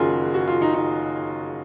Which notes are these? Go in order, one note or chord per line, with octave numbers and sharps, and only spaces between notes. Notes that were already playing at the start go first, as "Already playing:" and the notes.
Already playing: F#1 D#3 C#4 F4 F#4 G#4 A#4
F#4
F4
D#4
D#4